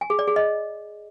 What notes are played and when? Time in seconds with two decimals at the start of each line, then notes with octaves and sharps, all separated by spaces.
0.01 G#5
0.10 G#4
0.19 D5
0.27 G#4
0.36 D#5